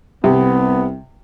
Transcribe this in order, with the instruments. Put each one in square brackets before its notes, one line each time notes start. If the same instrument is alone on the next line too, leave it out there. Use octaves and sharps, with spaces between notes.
[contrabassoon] C2 [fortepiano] C3 [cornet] B3